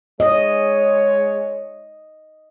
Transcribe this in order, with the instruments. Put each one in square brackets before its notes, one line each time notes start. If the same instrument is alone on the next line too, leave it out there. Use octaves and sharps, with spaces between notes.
[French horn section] G#3 C#5 [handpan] D#5